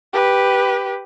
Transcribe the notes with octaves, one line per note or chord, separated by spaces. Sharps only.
G4 B4